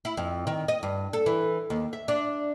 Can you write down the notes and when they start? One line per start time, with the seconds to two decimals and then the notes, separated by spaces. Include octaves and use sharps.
0.05 E4
0.17 F2
0.47 D#3
0.68 D#5
0.83 G2
1.13 A4
1.26 E3
1.70 D#2
1.93 E5
2.08 D4